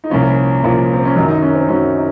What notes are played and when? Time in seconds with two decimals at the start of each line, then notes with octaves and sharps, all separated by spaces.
0.04 D#4
0.10 C2 A#2 F3 C#4
0.64 C2 A#2 F3
0.93 C4
1.05 C#4
1.16 F#2 D#3 F#3 D#4
1.28 D#4
1.42 C#4
1.55 C4
1.69 F#2 D#3 F#3 C#4
1.95 D#4